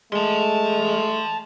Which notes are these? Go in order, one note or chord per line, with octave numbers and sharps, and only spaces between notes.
G#3 A3 A5 C6